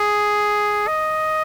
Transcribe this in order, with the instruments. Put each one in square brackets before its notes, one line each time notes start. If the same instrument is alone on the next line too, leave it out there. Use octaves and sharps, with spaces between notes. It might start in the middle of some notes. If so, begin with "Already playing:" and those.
Already playing: [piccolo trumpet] G#4
D#5